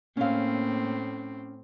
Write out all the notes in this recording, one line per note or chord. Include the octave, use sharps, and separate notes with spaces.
A2 A#3 C4 C#4 F5